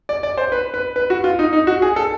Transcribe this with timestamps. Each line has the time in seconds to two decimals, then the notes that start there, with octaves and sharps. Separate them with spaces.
0.09 D5
0.23 D5
0.37 C5
0.52 B4
0.74 B4
0.96 B4
1.10 F#4
1.24 F4
1.39 D#4
1.53 D#4
1.67 F#4
1.82 G#4
1.96 A4